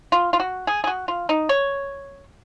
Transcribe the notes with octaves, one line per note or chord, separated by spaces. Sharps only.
F4
F4
F#4
G#4
G#4
F#4
F4
D#4
C#5